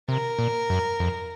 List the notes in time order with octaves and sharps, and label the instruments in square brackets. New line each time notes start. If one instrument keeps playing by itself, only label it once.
[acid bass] C3 [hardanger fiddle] A#4
[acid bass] A#2
F#2
F2